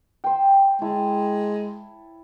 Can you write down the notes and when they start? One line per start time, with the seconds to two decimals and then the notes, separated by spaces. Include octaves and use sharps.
0.24 C5 G5
0.82 G#3 E4 C#5 A5